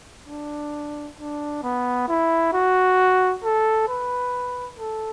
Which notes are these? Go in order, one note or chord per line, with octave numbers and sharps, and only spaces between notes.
D4
D4
B3
E4
F#4
A4
B4
A4